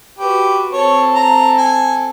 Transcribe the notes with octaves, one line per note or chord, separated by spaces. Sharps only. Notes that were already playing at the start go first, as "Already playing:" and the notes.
F#4 G4 B4
C4 A4 C#5
A#5
G#5